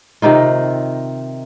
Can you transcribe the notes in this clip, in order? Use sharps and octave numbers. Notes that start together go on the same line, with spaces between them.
C3 D#3 D#4 F4